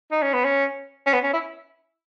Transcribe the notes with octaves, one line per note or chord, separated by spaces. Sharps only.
D#4
C#4
B3
C#4
C#4
B3
C#4
E4